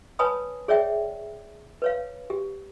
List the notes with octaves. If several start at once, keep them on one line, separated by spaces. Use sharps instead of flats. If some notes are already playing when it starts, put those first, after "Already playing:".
B4 C#5 G#5 A5 B5 D#6
G#4 C#5 D5 E5 G5
B4 C#5 F5
G4